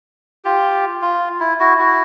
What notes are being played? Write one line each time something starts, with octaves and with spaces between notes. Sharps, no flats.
F4 G4
F4
E4
E4 F#4
E4 F#4